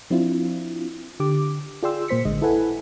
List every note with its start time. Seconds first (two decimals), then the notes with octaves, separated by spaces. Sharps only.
0.10 F3 C4 D4 E4 F4
1.20 D3 G4 D6
1.83 F4 G#4 D5 G5 C6 E6
2.08 A#2 A#3 C5 B6 C#7
2.25 A1 D3 G#3 D#5
2.42 E4 A4 B4 F#5 G#5